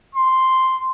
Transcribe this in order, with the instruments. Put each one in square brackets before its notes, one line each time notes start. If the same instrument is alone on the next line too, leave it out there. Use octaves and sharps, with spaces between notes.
[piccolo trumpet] C6